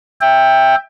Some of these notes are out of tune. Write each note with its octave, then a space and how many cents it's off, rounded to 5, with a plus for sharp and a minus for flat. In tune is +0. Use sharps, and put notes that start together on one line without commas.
E5 +0 G5 +15